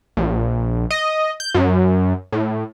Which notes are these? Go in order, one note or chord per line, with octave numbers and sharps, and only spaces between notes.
A#1
D#5
G6
F#2
A2